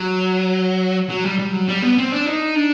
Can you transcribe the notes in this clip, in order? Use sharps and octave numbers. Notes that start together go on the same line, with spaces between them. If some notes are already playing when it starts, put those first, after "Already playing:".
Already playing: F#3
F#3
G3
G3
F#3
G3
B3
C4
D4
D#4
D4